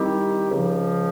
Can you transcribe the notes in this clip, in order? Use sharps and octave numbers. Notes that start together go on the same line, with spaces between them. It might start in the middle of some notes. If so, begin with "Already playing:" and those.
Already playing: D#3 G3 C4 E4 G4
C#2 C#3 F3